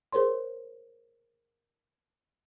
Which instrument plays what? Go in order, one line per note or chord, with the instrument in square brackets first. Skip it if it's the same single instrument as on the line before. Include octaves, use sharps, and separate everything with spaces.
[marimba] G#4 A#4 C5 C#5 C6